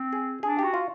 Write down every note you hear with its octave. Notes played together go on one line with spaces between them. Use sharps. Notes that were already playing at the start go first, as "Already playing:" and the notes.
Already playing: C4
G#4
D4 G#4
F#4 G4
F4